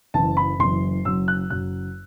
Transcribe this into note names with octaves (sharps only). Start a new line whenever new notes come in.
F#1 F#2 E3 A5
B5
F#1 F#2 E3 C6
F#1 F#2 F#3 E6
F#6
F#1 F#2 F#3 F#6